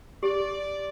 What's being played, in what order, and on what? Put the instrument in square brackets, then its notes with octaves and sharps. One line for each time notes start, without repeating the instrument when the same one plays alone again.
[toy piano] G4 [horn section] D5